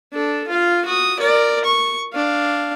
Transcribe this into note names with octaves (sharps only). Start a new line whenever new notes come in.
D4 A4
F4 F5
F#4 D#6
A#4 D5
C#6
D4 F5